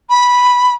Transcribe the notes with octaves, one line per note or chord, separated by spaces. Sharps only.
B5